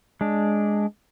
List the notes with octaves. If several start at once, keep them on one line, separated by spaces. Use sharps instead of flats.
G#3 D4